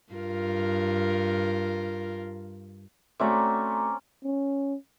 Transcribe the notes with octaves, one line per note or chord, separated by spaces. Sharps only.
G2 F4 A#4
A3 C4 C#4 F#4 D5 E5 A#5 D6
C#4